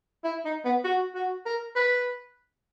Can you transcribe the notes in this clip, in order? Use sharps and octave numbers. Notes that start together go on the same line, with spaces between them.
E4
D#4
B3
F#4
F#4
A#4
B4